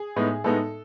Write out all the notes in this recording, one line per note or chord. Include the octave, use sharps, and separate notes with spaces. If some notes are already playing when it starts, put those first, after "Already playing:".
Already playing: G#4
A2 G#3 B3 D#4
A2 G#3 B3 D#4 A4